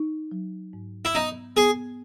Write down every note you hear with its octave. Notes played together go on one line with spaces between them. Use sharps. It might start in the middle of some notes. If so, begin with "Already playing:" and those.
Already playing: D#4
F#3
G#2
E4
B3 D#4
B3 G#4